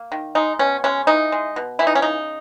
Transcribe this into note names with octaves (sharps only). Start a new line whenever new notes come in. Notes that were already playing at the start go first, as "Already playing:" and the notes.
Already playing: A#3
D#3
G#3 D#4
B2 C#4
G#3 C#4
E3 D#4
G#3
B2
E3 E4
D#4
C#4
C#3 D#4